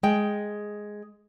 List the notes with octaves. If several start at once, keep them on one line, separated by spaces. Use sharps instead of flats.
G#3 G5